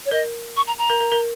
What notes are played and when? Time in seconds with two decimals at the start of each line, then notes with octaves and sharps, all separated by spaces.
0.05 C#5
0.11 A#4 D#5
0.56 C#6
0.67 A#5
0.78 A#5
0.90 A#4
1.00 A#4
1.12 A#4